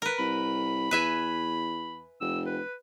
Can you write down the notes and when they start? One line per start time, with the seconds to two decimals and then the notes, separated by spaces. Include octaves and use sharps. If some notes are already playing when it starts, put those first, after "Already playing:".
0.02 A#4 B4
0.19 C2 B5
0.91 E2 B4 E5 G#5
2.21 F1 E6
2.46 B4